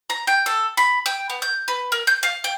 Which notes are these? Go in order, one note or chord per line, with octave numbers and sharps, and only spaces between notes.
A#5
G5
A4
B5
G5
B3
G6
B4
A#4
G6
F5
G5